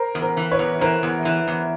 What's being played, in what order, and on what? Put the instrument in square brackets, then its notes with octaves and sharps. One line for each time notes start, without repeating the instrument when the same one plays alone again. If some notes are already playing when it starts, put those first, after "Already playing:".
Already playing: [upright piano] A#4 C5
[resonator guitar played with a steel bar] E2
[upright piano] A#4 C5
[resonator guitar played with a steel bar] E3
[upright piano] B4 C#5
[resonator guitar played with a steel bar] E2
[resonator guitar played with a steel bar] E3 [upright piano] A#4 C5
[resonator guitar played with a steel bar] E2
E3
E2